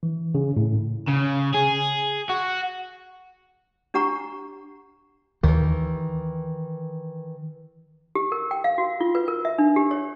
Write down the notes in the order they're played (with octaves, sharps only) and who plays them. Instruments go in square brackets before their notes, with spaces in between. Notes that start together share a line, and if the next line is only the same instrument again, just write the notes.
[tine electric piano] E3
C#3
A2
[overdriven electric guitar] C#3
G#4
F#4
[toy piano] D4 G4 F#5 A#5 C#6
[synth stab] D#2 [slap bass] D#3 E3
[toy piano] G4
A#4
G5
F5
F#4
F4
B4
A#4
E5
D4
G4
C#5